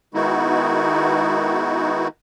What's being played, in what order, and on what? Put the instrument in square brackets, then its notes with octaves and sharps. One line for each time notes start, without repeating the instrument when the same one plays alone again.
[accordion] D#3 G#3 B3 D#4 E4 F#4